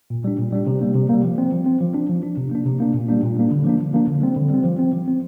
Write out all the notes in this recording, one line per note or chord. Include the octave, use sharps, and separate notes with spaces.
A#2
G3 D4
A#2
G3 D4
C3
G3 A#3
C3
G3 A#3
F3
C4
F3
C4
F3
D4
F3
D4
C3
A#3 D4
C3
A#3 D4
A#2
G3 A#3 D4
A#2
G3 A#3 D4
D3
F3 A#3 D4
D3
F3 A#3 D4
D3
G3 C4
D3
G3 C4
F3
C4
F3
C4